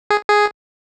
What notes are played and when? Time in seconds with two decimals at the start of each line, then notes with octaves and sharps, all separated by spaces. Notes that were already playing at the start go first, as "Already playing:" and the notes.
0.10 G#4
0.29 G#4